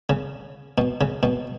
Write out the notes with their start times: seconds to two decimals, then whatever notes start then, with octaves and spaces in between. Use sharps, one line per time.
0.09 C#3
0.78 B2
1.01 C#3
1.23 B2